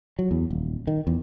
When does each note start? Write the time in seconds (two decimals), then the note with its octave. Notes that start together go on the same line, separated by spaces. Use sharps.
0.19 F#3
0.31 E2
0.50 D#1
0.87 D#3
1.07 E2